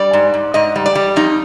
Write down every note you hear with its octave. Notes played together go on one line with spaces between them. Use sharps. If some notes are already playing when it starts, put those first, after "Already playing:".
Already playing: G3 D5
G#2
G#2
G#2 D#5
G3
D5
G3
F2 D#4